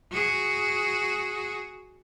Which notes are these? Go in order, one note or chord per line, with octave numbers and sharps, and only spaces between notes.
F#4 G#4